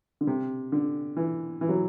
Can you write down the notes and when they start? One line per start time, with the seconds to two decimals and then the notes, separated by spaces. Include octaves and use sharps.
0.21 D3
0.27 C3
0.72 D3
1.17 E3
1.61 E3
1.69 F#3